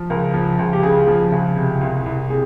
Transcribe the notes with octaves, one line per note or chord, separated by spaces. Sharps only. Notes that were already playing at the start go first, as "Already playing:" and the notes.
Already playing: F3
C#2 A#4
F3
C#2
G4
C#3 G#4
F3
C#2
C3
C2
C2
C3 G#4